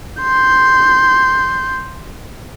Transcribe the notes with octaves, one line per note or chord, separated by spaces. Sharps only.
C6 G6